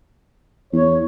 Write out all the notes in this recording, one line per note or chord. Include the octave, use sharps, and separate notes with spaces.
E2 C#5